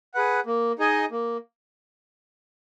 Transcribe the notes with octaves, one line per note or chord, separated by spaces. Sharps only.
G#4 B4 F#5
A#3
D#4 G#4 D#5 G#5
A#3